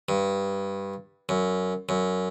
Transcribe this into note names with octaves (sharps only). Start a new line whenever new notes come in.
G2
F#2
F#2